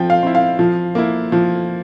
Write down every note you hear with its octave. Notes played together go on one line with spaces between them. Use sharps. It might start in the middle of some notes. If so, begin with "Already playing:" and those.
Already playing: F3 C4 G5
F5
C4 E4
F5
F3
A#3 E4
F3